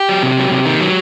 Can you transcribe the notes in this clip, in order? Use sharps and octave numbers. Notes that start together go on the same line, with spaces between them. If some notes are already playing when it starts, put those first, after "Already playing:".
Already playing: G4
F#3
C3
F#3
C3
D#3
F#3